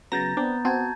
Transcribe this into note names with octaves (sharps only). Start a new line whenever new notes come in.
C#3 F#3 B3 A#5 G6 A6 A#6
B3 C4 D4
C4 F#4 A5 G6 G#6